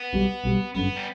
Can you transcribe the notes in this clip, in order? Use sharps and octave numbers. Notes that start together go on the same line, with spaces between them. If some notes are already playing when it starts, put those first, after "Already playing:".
Already playing: B3
B1 B2 G3
B1 B2 G3
G1 F#2 D3 B3
G3